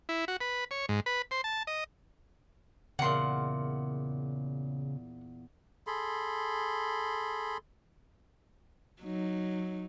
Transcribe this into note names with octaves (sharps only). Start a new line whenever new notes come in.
E4
F#4
B4
C#5
G#2
B4
C5
A5
D#5
E2 A#2 C#3 F#5 C6
G#4 A4 B5 C6
F#3 D#4